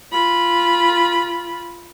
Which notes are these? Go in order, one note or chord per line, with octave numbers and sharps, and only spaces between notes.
F4 B5